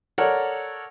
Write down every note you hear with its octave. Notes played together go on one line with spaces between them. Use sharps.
A4 A#4 C#5 D5 F#5